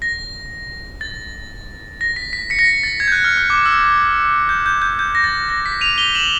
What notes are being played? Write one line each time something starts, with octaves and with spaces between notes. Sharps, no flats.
A#6
A6
A#6
B6
B6
B6 C#7
A#6
B6
A6
G#6
G6
F#6
F6
F6
D6
E6
G6
G6
G6
G6
A#6
A6
A#6
B6
D#7 F7
F7 G7
E7 F#7